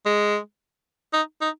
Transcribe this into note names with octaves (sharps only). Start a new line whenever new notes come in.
G#3
D#4
D#4